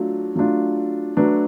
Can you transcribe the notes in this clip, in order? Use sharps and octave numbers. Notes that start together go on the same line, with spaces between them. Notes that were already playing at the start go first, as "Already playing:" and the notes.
Already playing: F#3 A3 D4 F4
F#3 A3 D4 F4
F#3 A3 D4 F#4 B4